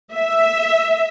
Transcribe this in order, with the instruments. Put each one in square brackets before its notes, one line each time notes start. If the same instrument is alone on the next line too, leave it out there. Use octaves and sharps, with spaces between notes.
[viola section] E5